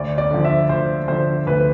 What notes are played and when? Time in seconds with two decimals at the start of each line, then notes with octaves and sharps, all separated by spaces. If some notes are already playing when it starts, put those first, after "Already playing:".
Already playing: D2 D5
0.18 D5
0.31 D3 F3
0.44 E5
0.69 D2 C5
1.08 D3 F3 C5
1.47 D2 B4